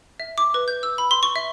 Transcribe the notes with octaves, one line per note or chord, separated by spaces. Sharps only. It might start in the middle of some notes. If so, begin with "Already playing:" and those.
E5
D6
B4
G6
E6
B5
C6
C#6
E5